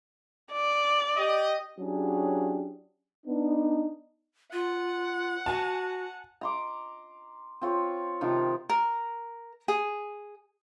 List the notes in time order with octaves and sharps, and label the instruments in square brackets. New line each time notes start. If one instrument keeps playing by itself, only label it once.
[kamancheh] D5
[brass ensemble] G4 D#5
[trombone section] F#3 C#4 D4 E4 G4 G#4
B3 D4 D#4
[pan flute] F4 [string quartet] F#5
[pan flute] F#4 [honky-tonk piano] G#5 A5
[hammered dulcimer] A#5 C6 D6
C4 F4 C#5
C3 D#3 F3 F4
[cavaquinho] A#4
G#4